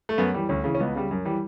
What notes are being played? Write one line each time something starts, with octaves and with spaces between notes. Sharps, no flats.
A3
F#2 B3
E3 G3
D2 C#4
C#3 E3
C#4
C#2 B3
C#3 G3
F#2
E3 G3